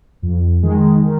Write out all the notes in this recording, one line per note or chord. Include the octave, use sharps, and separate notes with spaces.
F2
D#3 G#3
D#3